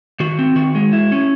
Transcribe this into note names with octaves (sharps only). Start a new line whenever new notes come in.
D#3 F#4
C4
D#3 F#4
G#3
E4
C#4